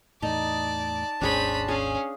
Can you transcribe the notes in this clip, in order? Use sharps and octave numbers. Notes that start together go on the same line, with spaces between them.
E2 A2 D#4 D5 A5
G#1 D#2 G#2 C#4 D4 G#4 C5 B5
C#4 G#4 F5